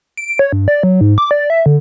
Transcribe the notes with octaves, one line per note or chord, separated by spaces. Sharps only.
D7
C#5
G2
D5
F#3
G#2
D6
D5
E5
D3